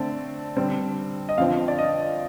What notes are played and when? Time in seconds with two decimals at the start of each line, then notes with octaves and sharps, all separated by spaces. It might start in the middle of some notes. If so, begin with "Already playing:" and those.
Already playing: D3 A3 C4 D5
0.57 D3 G3 C4
1.29 D#5
1.38 F2 D3 F3 C4 F5
1.68 D5
1.79 D#5